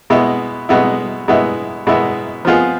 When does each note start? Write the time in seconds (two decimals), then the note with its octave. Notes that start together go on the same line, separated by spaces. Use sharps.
0.10 B2 G#3 B3 E4
0.69 B2 G#3 B3 E4
1.28 B2 G#3 B3 E4
1.87 B2 G#3 B3 E4
2.45 F3 B3 F4 G#4